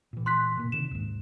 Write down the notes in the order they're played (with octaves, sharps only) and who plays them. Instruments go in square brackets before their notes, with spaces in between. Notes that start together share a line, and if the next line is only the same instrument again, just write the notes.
[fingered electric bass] A#2 E3
[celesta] C6 F#6 B6
[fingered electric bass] A#2 A#3
[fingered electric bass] C3 D#3 [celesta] E7
[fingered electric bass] D#2 G#2